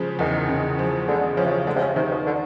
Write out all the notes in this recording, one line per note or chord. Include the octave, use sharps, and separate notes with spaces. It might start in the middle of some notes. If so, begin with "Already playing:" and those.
Already playing: C#3 F3 G#3
E2 D#3
C#3
F3
D3 G#3
C#3 F3
C3
C#3
D3 G#3
C3
C#3
C3 D#3
B2
D3